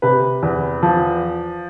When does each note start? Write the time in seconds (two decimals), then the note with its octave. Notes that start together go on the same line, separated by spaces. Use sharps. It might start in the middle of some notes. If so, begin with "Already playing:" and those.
0.02 C3 B4
0.43 E2
0.83 F3